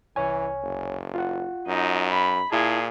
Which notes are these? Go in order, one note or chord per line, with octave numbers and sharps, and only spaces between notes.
C2 E3 C#5 G#5
F#1
F4 F#5
F#2 D#4
B5
A#2 E4 G#4 A5